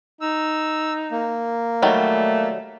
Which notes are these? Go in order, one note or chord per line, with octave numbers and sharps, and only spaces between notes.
D#4 E6
A#3
D#3 F#3 G3 A3